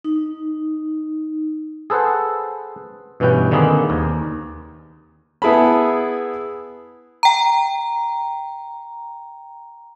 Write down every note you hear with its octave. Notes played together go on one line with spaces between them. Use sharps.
D#4
G#4 A4 B4 C5 F#5
G2 B2 E3 C#4 B4 G5
D3 D#3 A#3 C4 G#4 B4
D#2
B3 E4 G#4 A5 B5
G5 A#5